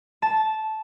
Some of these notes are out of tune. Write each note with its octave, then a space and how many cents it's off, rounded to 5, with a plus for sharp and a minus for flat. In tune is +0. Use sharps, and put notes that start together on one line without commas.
A5 -10